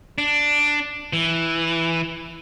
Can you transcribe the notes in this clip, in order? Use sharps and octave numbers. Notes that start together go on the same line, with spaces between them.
D4
E3